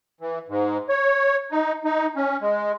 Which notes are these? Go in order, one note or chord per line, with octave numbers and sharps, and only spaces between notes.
E3
G#2
C#5
D#4
D#4
C#4
G#3